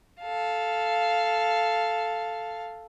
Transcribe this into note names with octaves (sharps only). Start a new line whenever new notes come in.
A4 F5